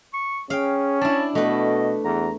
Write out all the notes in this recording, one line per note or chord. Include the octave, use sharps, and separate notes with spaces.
C#6
C#4 G#4 F5 G5
D4 E4 A5
B2 A3 B4 D#5
E2 A#5